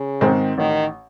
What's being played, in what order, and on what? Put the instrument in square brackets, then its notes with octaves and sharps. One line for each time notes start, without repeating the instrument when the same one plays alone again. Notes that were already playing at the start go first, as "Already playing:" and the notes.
Already playing: [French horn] C#3
[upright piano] G#2 D#3 G#3 C4
[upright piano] A1 [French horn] D#3